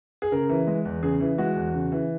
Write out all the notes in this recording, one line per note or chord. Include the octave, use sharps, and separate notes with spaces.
G#4
C#3 A#4
E3
G#3
E2
C#3 G#4
E3
G#3 F#4
E2
C#3
E3